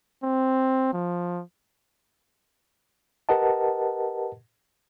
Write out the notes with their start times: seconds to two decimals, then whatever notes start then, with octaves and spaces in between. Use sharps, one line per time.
0.24 C4
0.94 F3
3.29 G4 A#4 B4 D#5 F#5 A5